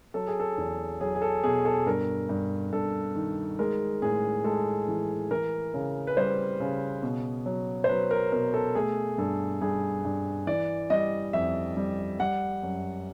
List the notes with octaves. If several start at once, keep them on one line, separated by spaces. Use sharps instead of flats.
F#3 A4
G#4
A4
E2
F#3 G#4
G#4
A4
B2 G#4
A4
G2 A#4
G2
G2 A4
D#3
G#3 A#4
A2 G#4
G#3 A4
E3
E3 A#4
C#3
B4
G3 C5
C#3
B2
F#3
C5
F#3 B4
A#4
B2 A#4
A4
A3 G#4
G2 A4
G2 G#4
G2
E3 D5
G3 D#5
F2 E5
G3
G3 F#5
F#2